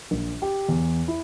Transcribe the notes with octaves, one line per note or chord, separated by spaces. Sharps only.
A#1
G4
E2
E4